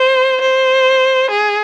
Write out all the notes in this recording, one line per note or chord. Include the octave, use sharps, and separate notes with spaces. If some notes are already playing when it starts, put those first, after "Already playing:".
Already playing: C5
C5
G#4